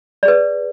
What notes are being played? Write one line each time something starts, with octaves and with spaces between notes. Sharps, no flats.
G#4 B4 D5